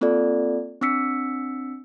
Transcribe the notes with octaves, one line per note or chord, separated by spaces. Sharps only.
A#3 C4 F4 A4 D5
C4 D4 E6 B6 C#7